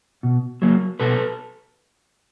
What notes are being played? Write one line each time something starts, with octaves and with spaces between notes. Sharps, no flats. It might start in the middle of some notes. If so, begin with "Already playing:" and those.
B2
F#3 A#3
B2 A4 B4